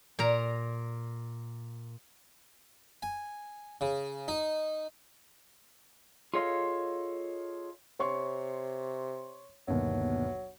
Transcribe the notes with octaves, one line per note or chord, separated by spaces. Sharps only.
A#2 A#4 A#5
G#5
C#3
D#4
F4 G#4 A4 C#5 D#5 F5
C3 C#5 C6 C#6
G1 D#2 B2 F#3